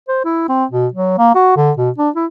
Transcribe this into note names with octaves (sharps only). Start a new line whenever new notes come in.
C5
E4
C4
B2
F#3
A#3
F#4
D3
B2
D4
E4